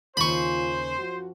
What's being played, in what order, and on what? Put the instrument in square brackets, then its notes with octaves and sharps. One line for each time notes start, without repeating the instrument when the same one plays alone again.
[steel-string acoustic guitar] D#2 C#3 G#5 [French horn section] F4 [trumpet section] C5 [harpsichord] B5 C#6
[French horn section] F#2 F3 F#4